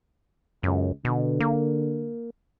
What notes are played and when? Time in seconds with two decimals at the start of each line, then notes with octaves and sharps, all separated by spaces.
0.63 C#2 F#2
1.05 B2 D3
1.40 A#3